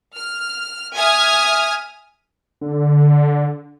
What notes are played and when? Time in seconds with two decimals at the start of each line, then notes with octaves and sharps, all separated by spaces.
0.13 F6
0.93 E5 G#5 D#6 F6 G#6
2.61 D3